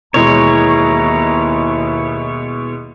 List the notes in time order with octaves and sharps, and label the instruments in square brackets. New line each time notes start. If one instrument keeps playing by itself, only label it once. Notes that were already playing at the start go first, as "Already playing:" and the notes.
[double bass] D#2 E4 [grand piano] B2 E3 G#3 [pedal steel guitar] C#5 [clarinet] A#5